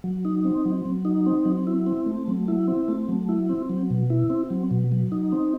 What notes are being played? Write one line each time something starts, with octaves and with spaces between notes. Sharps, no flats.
F#3
D#4
C4
F#3
F#3
D#4
C4
F#3
E4
C4
A3
F#3
E4
C4
A3
F#3
E4
C4
F#3
B2
E4
C4
F#3
B2
F#3
D#4
C4